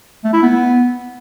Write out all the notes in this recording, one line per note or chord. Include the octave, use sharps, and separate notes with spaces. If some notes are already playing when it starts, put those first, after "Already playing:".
A3
E4
B3